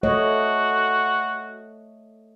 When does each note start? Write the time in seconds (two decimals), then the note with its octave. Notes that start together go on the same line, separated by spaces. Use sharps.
0.03 A3 F#4 C#5 D#5